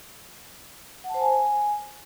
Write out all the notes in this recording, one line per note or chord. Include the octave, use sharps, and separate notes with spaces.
F#5
A5
C5
G#5